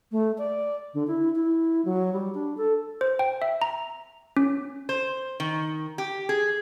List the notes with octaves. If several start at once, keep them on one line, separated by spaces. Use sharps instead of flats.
A3
D5
D3
E4
E4
F#3
G3
D4
A4
C5
G5
E5
A#5
C#4
C5
D#3
G4
G#4